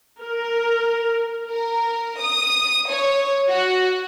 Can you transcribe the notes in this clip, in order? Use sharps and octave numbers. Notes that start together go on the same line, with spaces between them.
A#4
A#4
D#6
C#5
F#4